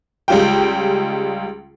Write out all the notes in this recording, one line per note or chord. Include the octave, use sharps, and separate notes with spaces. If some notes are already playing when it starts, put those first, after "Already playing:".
C#2 G3 G#3 F4 G5